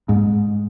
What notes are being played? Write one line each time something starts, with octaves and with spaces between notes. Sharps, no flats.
G#2